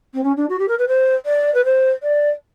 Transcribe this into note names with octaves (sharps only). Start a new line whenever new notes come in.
C4
C#4
D4
F#4
G4
A#4
B4
C5
D5
B4
C5
D5